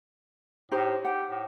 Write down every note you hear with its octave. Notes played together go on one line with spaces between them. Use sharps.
A2 D#4 G4 C5
G4 F#5
A2